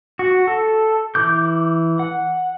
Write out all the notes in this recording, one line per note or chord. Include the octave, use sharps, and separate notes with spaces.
F#4
A4
E3 D6 G6
F#5